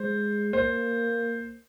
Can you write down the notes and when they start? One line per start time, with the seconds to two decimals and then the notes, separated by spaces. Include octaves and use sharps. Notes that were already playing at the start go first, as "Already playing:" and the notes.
Already playing: G#3 C5
0.53 A#3 C5